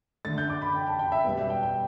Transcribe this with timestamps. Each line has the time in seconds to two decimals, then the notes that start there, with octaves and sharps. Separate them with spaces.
0.25 D3 A3 A6
0.38 G6
0.50 D6
0.62 B5
0.75 G5
0.87 A5
0.99 G5
1.12 E5
1.24 B2 G3 B3 E5
1.37 E5
1.50 G5
1.63 G5